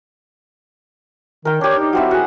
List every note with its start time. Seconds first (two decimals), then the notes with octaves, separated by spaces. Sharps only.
1.45 D#3 A#4 G5
1.61 D4 G4 C#5
1.79 D#4
1.93 F#3 C4 E4
2.11 F#4 G#4 F#5